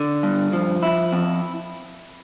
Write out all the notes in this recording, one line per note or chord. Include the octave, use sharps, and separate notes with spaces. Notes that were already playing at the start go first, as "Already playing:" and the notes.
Already playing: D3
G2
F3
E4
F2